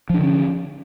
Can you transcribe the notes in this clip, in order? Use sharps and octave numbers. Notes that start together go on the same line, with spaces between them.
D3 F3 C#4 D4